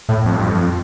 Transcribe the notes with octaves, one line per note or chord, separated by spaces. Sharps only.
A2
F2
G2
F2